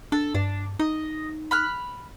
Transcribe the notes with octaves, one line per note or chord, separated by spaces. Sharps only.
D4 A4
G2 D4
D#4 D#5
B5 F6 F#6